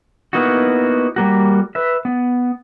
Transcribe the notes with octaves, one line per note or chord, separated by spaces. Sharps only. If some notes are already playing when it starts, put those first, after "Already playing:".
A#3 B3 D#4 E4 F#4
G3 A#3 F#4
B4 E5
B3